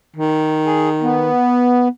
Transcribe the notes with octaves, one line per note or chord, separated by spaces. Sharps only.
D#3
G#4
B3